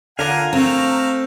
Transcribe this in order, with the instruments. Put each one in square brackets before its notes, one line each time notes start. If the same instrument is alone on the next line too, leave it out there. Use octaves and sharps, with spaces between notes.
[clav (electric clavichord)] D3 D4 [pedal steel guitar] F4 A#4 F5 [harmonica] F#5 G#5
[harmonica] A3 F5 [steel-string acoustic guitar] C4 [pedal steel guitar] A#5